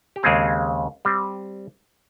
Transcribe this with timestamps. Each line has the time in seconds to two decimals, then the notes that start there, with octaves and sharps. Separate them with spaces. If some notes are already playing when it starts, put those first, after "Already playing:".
0.16 G4
0.23 D#2 C#3 G#3 C4 G#4
1.05 G3 C4